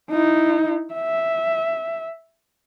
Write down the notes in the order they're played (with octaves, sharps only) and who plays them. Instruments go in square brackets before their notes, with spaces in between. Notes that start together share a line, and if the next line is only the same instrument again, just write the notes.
[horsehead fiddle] D#4 E4
E5